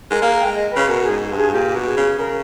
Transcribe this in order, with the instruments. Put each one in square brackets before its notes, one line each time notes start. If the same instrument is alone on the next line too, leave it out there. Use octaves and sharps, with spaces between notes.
[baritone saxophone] G#3 [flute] A#4
[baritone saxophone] A#3 [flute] G#4
[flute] G5
[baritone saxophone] G#3
[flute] D#5
B4
[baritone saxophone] C#3
[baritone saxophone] B2 [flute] A#4
[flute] G#4
[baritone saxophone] G#2
G2
[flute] G#4
[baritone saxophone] A#2 [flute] G4
[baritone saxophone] B2
[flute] G#4
[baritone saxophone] C#3
[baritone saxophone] C#3 [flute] A#4